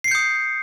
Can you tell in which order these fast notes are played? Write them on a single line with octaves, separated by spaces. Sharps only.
C7 C#7 G6 D#6